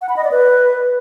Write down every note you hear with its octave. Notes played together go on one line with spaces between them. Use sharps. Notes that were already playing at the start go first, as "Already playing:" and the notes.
F#5
B5
D#5
D5
B4